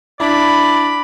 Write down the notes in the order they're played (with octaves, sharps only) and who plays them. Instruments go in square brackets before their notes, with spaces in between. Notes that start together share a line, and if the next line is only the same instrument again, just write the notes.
[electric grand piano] D4 E4 [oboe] D5 [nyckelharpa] B5